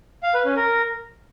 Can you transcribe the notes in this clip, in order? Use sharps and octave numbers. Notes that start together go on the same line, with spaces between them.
F5
B4
C#4
A#4